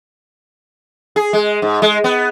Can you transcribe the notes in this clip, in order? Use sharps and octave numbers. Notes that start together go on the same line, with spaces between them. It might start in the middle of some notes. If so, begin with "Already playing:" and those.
G#4
G#3
G#2
G#3
B3